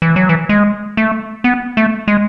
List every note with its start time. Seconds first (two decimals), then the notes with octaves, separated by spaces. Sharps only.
0.02 E3
0.16 F#3
0.29 E3
0.49 G#3
0.97 A3
1.44 B3
1.77 A3
2.08 G#3